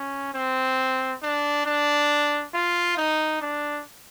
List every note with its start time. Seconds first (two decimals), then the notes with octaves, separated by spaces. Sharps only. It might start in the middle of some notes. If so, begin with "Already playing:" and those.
Already playing: C#4
0.34 C4
1.22 D4
1.66 D4
2.54 F4
2.97 D#4
3.41 D4